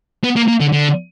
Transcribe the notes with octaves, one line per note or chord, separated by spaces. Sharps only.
B3
A#3
A#3
D3
D3